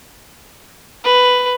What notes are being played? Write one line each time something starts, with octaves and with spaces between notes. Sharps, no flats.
B4